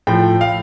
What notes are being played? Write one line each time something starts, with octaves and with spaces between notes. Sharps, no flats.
A2 F3 G5
F5